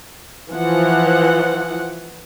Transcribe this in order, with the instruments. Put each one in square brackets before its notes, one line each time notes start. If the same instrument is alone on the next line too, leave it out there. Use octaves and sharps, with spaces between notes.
[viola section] E3 F3 F#5